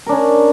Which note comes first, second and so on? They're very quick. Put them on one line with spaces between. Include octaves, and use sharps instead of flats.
A#4 D4 C#4